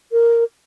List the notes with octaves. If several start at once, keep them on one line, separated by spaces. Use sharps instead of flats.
A#4